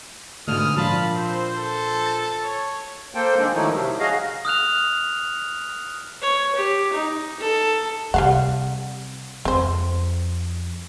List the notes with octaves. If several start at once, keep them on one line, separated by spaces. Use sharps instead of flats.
G#2 B2 D3 E3 A3 D4 D#6 F6
A#2 F3 D4 F4 A5 B5
C4 C5
A4
A6
C#5
A#3 A4 C5 G5
D#3 G#3 D4
D#3 F3 F#3 A3 D#4 E4
C3 F#3 G3
F#4 G#4 D#5 F5
D#6 F6 F#6 F7
C#5
G4
D#4
A4
C3 G3 F5 F#5
F2 C4 C5